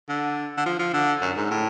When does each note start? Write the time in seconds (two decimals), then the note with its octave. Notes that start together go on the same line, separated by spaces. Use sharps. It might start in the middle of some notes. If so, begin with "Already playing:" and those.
0.09 D3
0.58 D3
0.66 F3
0.79 F3
0.94 D3
1.22 F#2
1.37 G#2
1.51 A2